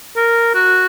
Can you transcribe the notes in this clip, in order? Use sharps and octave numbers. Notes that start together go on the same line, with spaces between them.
A#4
F#4